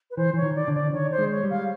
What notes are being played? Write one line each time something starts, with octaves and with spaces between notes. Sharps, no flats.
B4
E3 C5
E3 C#5
D#3
D5
D3
D5
D#3 C#5
C5
G#3
C#5
G3
F5